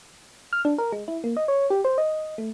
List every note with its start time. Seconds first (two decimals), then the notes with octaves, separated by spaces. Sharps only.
0.53 F6
0.65 D4
0.78 A#4
0.93 G#3
1.08 E4
1.24 A#3
1.37 D#5
1.48 C#5
1.70 G4
1.85 C5
1.98 D#5
2.38 A3